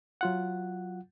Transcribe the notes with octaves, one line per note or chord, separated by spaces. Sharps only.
F#3 F4 F#5